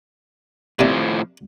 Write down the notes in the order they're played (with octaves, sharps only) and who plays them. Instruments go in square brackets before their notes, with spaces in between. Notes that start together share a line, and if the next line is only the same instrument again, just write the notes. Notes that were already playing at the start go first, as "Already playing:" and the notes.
[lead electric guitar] A2 F3 [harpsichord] C3 A#3 D4